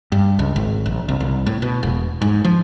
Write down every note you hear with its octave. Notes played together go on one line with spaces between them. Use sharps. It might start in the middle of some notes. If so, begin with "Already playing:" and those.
G2
C#2
G#1
A#1
C2
C2
A2
B2
E1
G#2
F3